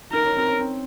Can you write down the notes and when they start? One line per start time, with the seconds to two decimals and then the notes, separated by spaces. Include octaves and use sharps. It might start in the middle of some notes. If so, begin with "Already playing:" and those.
0.12 D#4 A#4
0.25 C#4
0.37 C4
0.48 C#4
0.59 C4